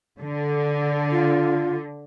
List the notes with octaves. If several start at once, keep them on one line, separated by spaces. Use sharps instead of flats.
D3
F4